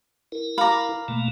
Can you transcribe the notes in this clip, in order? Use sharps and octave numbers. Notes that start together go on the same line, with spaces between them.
E4 A#4
F5 A#5 B5 D6
B2 A3 A#3